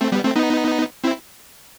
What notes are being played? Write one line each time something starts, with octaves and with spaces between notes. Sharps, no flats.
A3 C4
G3 B3
A3 C4
B3 D#4
C4 E4